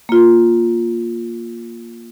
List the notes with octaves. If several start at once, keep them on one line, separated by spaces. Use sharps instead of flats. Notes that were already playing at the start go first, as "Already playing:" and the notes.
A#3 F4